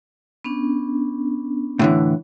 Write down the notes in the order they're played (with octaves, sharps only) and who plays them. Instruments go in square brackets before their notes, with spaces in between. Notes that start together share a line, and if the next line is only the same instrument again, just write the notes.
[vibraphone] B3 C#4 D4
[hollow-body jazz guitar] A2 D3 E3